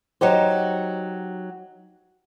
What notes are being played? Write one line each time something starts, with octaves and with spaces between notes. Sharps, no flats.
F#3 D#4 G4 C5